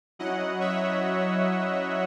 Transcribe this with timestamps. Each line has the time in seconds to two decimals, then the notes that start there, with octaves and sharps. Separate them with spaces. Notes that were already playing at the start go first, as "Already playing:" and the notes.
0.19 F#3 C#4 E4 D#5 F#5
0.61 C#5 E5